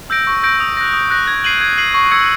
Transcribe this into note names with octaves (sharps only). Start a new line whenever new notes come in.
E6 G6 A#6 D7
C#6
E6 G6 A#6 D7
D#6
F#6 A#6
D#6
F#6 A#6
G#6
C7 D#7 F#7
G#6
C7 D#7 F#7
C#6
E6 G#6 C#7